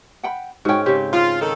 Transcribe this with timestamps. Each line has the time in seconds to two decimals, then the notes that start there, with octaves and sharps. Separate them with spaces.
0.23 F#5 G5 B5
0.65 G#2 C#4 F#4 G5
0.86 C#3 C4 G4
1.13 F4 F5
1.40 D#3 A4